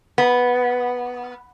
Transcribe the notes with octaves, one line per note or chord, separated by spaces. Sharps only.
B3